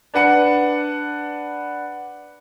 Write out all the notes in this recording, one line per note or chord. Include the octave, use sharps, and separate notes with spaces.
D4 B4 F#5 C#7